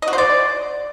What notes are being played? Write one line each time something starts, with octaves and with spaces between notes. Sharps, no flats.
D#5
F#4
C5
D5